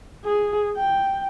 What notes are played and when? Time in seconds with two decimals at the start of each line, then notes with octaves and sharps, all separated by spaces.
0.25 G#4
0.77 G5